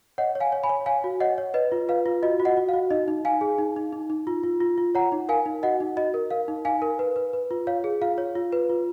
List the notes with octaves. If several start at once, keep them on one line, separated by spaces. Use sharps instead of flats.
C#5 D#5 F#5
C#5
F5 G#5
C#5
G#5 B5
C#5
C#5 F5 G#5
F#4
C#5 D#5 F#5
C#5
B4 D#5
F4
B4 F5
F4
F#4 D#5
F#4
D#5 F#5
F#4
F5
F#4
D#4 D#5
D#4
D#4 F5 G#5
G#4
D#4
D#4
D#4
D#4
F4
F4
F4
F4
C#5 F#5 A#5
D#4
A#4 F5 G#5
D#4
F#4 D#5 F#5
D#4
F#4 D#5
A#4
A#4 F5
D#4
D#4 F5 G#5
A#4
B4
B4
B4
F4
C#5 F5
G#4
F4 F5
C#5
F4
B4
F4